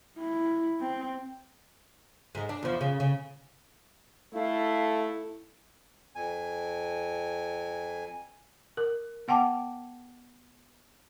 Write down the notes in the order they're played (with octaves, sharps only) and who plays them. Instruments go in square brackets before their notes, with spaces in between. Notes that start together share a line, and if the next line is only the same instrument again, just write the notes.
[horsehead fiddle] E4
C4
[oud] G#2 G#3
D4
E2 F3
C#3
C#3
[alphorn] A3 [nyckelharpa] E4 A4 [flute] F5
[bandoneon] F2 G#5
[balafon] A#4
B3 F#5 G5 A5 D6